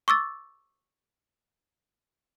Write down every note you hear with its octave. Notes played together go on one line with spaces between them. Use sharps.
C#6 D6 E6 A6